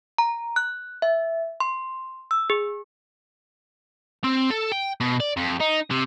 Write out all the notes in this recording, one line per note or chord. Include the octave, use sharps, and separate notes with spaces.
A#5
F#6
E5
C6
E6
G#4
C4
A4
G5
B2
D5
F2
D#4
C3